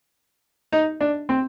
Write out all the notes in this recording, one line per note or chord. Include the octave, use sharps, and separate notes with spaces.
D#4
D4
C4